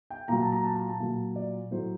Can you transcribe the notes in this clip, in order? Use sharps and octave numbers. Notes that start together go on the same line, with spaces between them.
G5
A#2 F#3 A#5
A5
A#5
A5
A#5
A5
A#2 F#3
D5
A2 F#3 C5